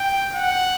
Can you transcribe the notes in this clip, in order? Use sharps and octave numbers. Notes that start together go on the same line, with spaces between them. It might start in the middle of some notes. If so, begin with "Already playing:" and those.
Already playing: G5
F#5